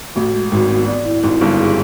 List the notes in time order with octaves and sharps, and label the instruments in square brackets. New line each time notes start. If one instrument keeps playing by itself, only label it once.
[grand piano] A1 A2 [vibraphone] F#4
[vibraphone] G#3
[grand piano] G#1 G#2 [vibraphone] F#4
[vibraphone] B3
D5
E4
[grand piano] G#1 G#2 [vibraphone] E4
[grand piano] G1 G2 [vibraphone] E4
[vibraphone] G#4